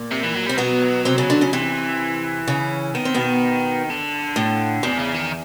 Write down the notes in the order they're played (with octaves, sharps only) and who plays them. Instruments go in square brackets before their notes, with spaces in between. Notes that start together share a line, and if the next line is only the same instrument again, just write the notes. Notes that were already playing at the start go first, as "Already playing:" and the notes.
Already playing: [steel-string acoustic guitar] A#2 A#3
[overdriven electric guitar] C3
E3
F#3
[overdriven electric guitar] G3 [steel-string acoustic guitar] C4
[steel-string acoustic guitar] B2 B3 [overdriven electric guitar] F#3
[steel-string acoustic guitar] C3 C4
C#3 C#4
D3 D4
C#3 C#4
[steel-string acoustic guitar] C3 C4 [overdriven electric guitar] E3
[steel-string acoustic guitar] C#3 C#4
[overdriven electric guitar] D#3 [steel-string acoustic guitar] B3
[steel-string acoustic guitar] C4
B2 B3
[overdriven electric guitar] D3
[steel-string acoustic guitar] A2 A3
[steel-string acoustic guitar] E2 E3 [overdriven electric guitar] C3
[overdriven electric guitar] C#3
D#3